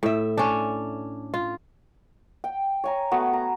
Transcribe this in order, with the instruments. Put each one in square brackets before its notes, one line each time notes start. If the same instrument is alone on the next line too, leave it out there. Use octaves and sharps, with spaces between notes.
[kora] A2 E5
C#4 D4
F4
[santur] G5
C#5 G#5 A#5
A3 B3 F#4
A#5